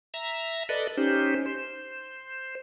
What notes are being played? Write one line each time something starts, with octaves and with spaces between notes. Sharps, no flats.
E5 A#5
A4 B4 D5 D#5
C#4 D#4 G4 C5
C5